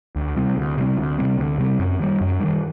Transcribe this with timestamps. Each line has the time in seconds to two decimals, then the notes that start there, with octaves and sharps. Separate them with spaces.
0.16 D2
0.36 C3 G3 C4
0.57 D2
0.77 C3 G3 C4
0.98 D2
1.18 C3 G3 C4
1.39 D2
1.58 C3 G3 C4
1.79 F#2
1.99 D#3 G3
2.21 F#2
2.40 D#3 G3